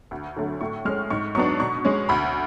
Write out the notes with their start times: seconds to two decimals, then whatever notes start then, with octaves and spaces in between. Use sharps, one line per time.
0.11 D2
0.37 D3 F#3 A3
0.61 A2 C#6
0.85 G#3 F6
0.89 C#4
1.10 G#2 C#6
1.35 F#3 B3 D4 C#6
1.60 B2 C#6
1.85 G#3 C#4
2.09 D2 B5